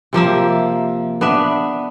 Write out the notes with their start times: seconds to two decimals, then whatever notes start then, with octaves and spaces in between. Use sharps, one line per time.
0.13 C3 F3 A#3 E5
1.21 B3 D4 E5